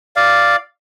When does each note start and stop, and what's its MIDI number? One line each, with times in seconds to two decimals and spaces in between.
0.16 0.56 74
0.16 0.56 77